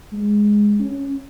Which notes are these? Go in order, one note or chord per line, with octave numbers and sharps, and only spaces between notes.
G#3
C#4